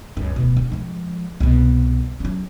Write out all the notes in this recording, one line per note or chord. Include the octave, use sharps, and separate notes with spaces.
C#2 F#2
D1 B2
D4
F3 G#3
C2 B2
F#3 C#4